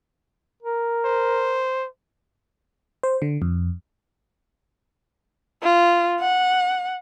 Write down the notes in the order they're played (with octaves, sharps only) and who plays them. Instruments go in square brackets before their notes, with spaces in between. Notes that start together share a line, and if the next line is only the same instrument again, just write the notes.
[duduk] A#4
[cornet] C5
[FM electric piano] C5
D3
F2
[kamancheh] F4
F#5